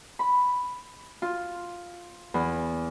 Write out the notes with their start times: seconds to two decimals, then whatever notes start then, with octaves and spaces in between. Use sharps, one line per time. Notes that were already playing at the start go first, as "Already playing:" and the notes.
0.19 B5
1.22 F4
2.34 E2